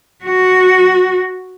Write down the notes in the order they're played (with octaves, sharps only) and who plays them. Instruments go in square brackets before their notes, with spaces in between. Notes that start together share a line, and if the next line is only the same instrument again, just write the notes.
[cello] F#4